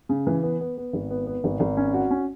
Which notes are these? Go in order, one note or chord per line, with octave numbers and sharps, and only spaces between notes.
C#3
E3
B3
B3
B3
G#1
B3
B3
G#1
G#1
C#4
F#4
C#4